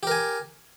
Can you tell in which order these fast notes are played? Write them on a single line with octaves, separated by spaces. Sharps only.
G4 A#4 G#5